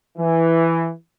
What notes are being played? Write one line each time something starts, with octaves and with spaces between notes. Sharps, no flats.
E3